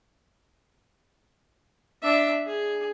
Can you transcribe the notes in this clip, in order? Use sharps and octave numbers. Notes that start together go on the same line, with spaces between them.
D4 E5
G#4